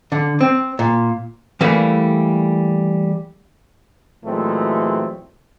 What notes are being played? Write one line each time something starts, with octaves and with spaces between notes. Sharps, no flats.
D3
C4
A#2
E3 G3 A3 A#3
A#2 E3 F#3 G#3 A3 C4